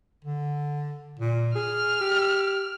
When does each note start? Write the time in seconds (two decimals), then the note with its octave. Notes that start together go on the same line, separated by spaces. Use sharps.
0.24 D3
1.19 A#2
1.55 G#4 F6
2.01 G4